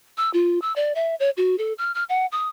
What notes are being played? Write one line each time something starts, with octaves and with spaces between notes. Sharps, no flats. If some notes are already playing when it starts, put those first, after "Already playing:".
E6
F4
E6
D5
E5
C#5
F#4
A4
F6
F6
F#5
D#6